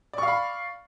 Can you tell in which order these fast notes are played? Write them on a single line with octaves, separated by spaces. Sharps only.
D5 C#6 F5 B5